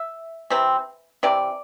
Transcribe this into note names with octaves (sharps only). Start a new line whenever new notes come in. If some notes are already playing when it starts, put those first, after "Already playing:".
Already playing: E5
C3 E3 C4
C3 E3 C4 D5